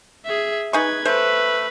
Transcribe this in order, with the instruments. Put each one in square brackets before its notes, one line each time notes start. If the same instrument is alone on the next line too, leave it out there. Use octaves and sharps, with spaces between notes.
[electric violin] G#4 E5
[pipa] D#4 G#4 C#6 [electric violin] B4 G#6
[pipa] A3 C5 [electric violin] B4